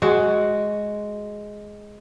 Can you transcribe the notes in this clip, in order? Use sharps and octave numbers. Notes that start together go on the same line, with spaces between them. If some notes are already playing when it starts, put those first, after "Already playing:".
G#3 F#4